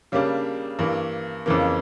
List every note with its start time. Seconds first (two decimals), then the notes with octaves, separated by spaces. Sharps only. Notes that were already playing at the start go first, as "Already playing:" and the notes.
0.12 C#3 G3 A#3 D4
0.79 G2 E3 A#3
1.46 F2 C#3 E3 A#3